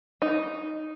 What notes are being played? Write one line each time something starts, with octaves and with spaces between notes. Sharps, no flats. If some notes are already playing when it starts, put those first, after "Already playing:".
D#4